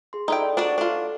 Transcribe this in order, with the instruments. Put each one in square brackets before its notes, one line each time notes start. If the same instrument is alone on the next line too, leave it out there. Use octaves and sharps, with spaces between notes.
[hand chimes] G#4 C6
[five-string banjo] D#4 E4 G5 [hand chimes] A4 D5 D#5
[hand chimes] D5
[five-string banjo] D4 F#4 D5 [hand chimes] C5 C#6
[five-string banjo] D4 F4 [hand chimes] A4